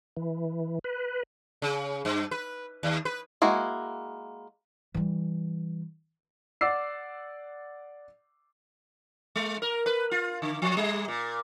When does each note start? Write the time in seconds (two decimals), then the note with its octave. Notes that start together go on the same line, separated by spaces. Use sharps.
0.17 E3
0.84 B4
1.62 C#3
2.05 G2
2.31 B4
2.83 D#2
3.05 B4
3.42 G#3 A#3 E4 F#4
4.94 E3 G3
6.61 D5 F#5 D6 E6 C7
9.36 G#3
9.62 A#4
9.86 B4
10.11 F4
10.42 D3
10.62 F3
10.77 G3
11.08 A#2